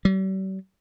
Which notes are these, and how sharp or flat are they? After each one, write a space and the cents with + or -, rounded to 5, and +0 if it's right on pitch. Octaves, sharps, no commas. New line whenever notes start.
G3 -45